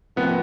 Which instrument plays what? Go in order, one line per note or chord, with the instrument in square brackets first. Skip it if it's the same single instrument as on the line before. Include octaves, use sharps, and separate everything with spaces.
[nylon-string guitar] C3 F3 A#3 [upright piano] B3